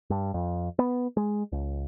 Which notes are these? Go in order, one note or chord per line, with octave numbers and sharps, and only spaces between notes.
G2
F2
B3
G#3
C#2